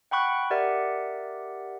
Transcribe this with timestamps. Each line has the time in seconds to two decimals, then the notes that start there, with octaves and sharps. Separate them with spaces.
0.11 F#5 G5 B5 C#6 F#6
0.51 G4 A#4 D5 E5 F#5